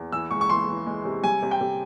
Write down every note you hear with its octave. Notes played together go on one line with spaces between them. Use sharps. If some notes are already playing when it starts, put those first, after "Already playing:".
Already playing: E2
E3 E6
C#2 C#6
C#6
E3 C6
E3
G#3
C3
G3 G#5
C3
G5
C3